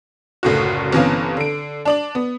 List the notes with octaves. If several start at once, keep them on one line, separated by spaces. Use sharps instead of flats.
F#1 C#2 A2 D3 F#4
G1 C3 E3 B3 C#4 F5
D3 D7
D4 D5 F#7
B3